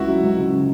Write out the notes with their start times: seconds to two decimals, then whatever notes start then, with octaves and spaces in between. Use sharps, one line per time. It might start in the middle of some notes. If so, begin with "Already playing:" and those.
Already playing: C#2 C#3 E4 F#4
0.08 F#3
0.23 C#2
0.38 C#3
0.53 C#3